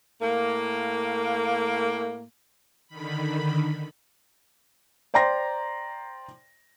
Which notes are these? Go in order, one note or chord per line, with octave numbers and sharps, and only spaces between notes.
A2 A#3
D3 D#3 B5
C5 D5 G5 A#5 C6 A#6